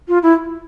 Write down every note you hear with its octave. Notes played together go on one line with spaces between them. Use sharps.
F4
E4